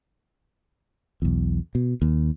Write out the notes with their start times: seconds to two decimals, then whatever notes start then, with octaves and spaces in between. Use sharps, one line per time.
1.22 B1 E2
1.75 B2
2.02 D#2